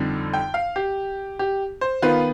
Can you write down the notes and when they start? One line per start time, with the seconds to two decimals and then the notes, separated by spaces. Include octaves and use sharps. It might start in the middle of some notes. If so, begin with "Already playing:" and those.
Already playing: F2 D3 G3 C4 D#4
0.33 G5
0.54 F5
0.76 G4
1.39 G4
1.81 C5
2.02 D#3 B3 F4 B4